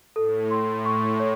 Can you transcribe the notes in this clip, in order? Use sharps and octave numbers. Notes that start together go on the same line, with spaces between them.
A2 A4
A2 C6
C#6
C#5